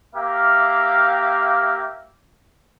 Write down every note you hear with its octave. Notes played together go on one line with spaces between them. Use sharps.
A#3 G4 E5 F5